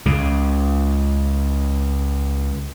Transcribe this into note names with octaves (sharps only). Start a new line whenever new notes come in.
C#2 C#3